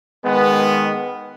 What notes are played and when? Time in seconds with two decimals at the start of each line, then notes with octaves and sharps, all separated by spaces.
0.24 D#3 G#3 B3